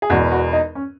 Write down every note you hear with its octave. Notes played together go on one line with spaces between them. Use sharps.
G#4
E1 E2 B2 F#4
F#4
D#4
C#4